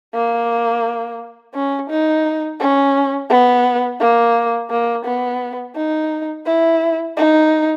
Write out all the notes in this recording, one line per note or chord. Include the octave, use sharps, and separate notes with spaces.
A#3
C#4
D#4
C#4
B3
A#3
A#3
B3
D#4
E4
D#4